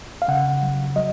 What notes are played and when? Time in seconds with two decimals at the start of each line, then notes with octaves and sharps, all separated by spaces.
0.22 F5
0.28 C#3 F#5
0.62 F#3
0.96 F#3 D#5